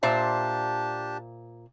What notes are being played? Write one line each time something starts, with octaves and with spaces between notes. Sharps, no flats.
A#2 D4 G4 C5 E5 A5